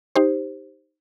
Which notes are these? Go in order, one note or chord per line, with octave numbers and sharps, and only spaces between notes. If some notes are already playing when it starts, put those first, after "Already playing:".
D#4 G4 C5